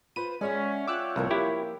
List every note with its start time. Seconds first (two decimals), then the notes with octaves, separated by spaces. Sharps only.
0.16 F4 B4 C5 B5 D#7
0.41 G#3 C#4 D5 E5 F#5
0.87 F4 C#5 G5 D6 E6 F#6
1.16 C2 A2 F3 A#3 A#4
1.31 E4 G4